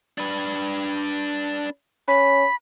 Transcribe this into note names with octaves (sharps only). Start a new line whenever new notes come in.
D4 B4
C#4 B5